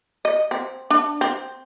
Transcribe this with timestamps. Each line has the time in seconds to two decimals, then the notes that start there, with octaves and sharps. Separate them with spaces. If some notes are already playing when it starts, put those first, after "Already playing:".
0.25 D#5
0.51 C4
0.90 D4
1.21 C4